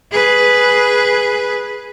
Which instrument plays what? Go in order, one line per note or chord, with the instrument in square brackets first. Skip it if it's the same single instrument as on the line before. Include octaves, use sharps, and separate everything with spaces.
[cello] G#4 B4